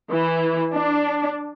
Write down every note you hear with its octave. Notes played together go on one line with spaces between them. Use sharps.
E3
D4